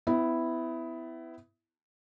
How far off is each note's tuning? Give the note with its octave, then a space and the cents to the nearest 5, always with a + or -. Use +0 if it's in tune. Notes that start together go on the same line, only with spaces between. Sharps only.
B3 +35 E4 +0